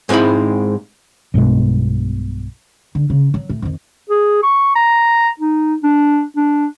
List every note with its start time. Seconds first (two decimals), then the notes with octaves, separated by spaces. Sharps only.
0.09 G#2 G#3 C4 E4 B5
1.34 B1 G2 B2 G#3
2.95 D3
3.10 C#3
3.34 F#3
3.50 A2
3.62 F2 D#3
4.10 G#4
4.43 C#6
4.75 A#5
5.39 D#4
5.84 D4
6.36 D4